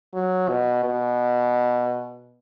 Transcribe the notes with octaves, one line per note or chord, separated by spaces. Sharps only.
F#3
B2
B2